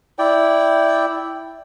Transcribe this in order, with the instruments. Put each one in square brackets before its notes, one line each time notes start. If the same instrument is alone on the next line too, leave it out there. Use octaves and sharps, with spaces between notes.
[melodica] E4 D5 G5